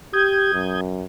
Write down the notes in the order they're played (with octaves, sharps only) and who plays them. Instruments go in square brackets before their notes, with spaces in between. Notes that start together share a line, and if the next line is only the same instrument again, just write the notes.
[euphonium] G4 [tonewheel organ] D#6 G6 G#6
[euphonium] F#2